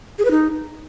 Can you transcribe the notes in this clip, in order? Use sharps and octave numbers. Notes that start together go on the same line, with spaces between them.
G#4
B4
D#4